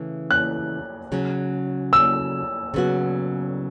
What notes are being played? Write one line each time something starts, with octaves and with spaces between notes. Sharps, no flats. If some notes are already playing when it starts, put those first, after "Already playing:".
Already playing: C#3 E3 A3
F#6
C#3 F#3 C#4
E6
C#3 F#3 B3 F#4